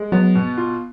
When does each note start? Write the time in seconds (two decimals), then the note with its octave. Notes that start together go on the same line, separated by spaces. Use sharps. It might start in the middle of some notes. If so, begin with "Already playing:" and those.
Already playing: G#3
0.12 F#3 B3
0.35 B2
0.57 F4